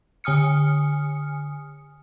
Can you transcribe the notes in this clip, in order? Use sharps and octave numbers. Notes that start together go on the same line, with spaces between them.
D3 G#5 D#6 F6 C#7